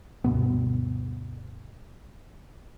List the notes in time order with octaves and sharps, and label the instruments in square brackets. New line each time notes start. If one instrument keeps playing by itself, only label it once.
[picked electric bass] D2 G2 B2 B3